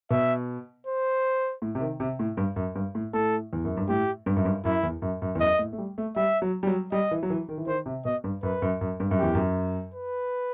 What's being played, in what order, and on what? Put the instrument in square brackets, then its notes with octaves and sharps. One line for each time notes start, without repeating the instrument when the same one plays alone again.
[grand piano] B2 [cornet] E5
[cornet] C5
[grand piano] A2
C3
D#3
C3
A2
G2
F#2
G2
A2
[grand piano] A2 [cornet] A4
[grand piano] E2
F#2
G2
[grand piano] A2 [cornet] G4
[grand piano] G2
F#2
G2
[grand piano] F#2 [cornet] E4
[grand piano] E2
F#2
F#2
E2
[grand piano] F#2 [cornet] D#5
[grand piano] A2
A3
G3
A3
[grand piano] G3 [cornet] E5
[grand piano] F#3
G3
F#3
[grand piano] G3 [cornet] D#5
[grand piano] E3
F#3
E3
D#3
E3
[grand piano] D#3 [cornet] C5
[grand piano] C3
[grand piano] B2 [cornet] D#5
[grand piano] G2
[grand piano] F#2 [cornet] B4
[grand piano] F#2
F#2
G2
F#2
[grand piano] E2 [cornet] G4
[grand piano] F#2
[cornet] B4